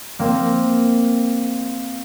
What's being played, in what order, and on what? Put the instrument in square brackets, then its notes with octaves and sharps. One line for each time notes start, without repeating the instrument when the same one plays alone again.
[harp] A#3 C4